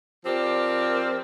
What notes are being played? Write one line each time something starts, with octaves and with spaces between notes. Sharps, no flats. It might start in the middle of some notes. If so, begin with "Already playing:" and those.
F3 C4 G4 A#4 D5